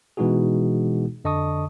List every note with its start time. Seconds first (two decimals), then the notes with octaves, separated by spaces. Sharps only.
0.17 B2 E3 G#3 D#4 F#4 G#4
1.24 F2 D3 D#5 A5 C#6 D#6